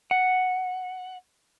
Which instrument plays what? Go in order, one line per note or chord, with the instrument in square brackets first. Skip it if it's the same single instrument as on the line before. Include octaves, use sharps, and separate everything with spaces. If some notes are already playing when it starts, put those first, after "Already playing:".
[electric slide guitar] F#5